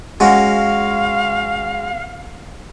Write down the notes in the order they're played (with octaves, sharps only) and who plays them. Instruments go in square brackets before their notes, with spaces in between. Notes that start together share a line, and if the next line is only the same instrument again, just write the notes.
[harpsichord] G#3 C#4 F#4 [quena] F5